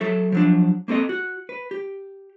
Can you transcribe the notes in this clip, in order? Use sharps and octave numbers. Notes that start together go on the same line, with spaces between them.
F#3 A4 E5
F3 F#3 D4
A#3 C4 A4 D#5
F#4
B4
G4